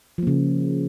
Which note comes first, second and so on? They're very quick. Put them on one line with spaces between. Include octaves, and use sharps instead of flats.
F3 A#3 C#3